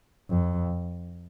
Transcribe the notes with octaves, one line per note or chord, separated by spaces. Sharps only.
F2